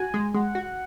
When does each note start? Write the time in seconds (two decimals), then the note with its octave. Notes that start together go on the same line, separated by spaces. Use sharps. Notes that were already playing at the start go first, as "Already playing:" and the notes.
Already playing: F#4 G#5
0.14 G#3
0.34 G#3 F#5
0.55 F#4